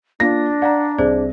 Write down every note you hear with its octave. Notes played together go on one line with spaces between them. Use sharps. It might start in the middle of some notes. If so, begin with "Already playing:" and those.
A#3 D4 F4 A#6
D5 F5 F#5 A#5
C2 G#4 C5 D5